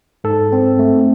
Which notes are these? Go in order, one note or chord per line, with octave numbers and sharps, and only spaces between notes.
G#2 A4
C4
A3